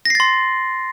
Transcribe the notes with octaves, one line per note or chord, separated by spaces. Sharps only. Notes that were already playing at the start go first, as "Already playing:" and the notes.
C6 A6 A#6 C7